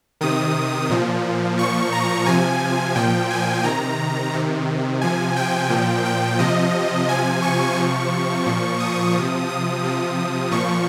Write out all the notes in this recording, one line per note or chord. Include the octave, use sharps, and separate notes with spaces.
C3 D#3 D#6
A#2 F3
A#2 F3 C#6
A#5
C3 F3 G#5
A#2 F3 G5
G#5
C3 D#3 A#5
C3 D#3
C3 F3 G#5
G5
A#2 F3
G5
C3 F3 D#5
C3 F3 G#5
C#6
C3 F3
A#2 F3
D#6
C3 F3
D#6
C3 F3
A#2 F3 C#6